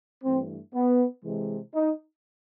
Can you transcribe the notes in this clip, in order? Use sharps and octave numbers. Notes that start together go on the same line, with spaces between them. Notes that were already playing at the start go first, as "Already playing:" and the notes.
G2 E3 A3 C4
B3
C3 E3 G#3
D#4